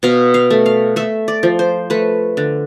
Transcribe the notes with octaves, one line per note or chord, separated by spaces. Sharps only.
B2 F5
F5
A3
F5
A3 E5
D5
F3
C5
A3 B4
D3